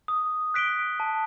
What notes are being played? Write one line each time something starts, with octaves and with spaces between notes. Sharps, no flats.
D#6
F#6 B6 D7 G7
A5